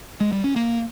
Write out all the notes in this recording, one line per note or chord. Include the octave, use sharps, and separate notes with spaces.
G#3
G3
C#4
A#3